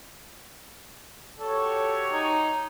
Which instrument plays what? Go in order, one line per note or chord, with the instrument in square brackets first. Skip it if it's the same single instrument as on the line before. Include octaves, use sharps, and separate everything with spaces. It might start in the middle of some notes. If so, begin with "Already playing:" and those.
[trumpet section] F#4 G4 C#5 [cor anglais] A4
[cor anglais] D#4